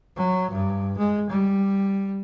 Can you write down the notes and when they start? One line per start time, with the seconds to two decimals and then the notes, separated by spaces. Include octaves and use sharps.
0.17 F#3
0.51 G2
0.97 G#3
1.30 G3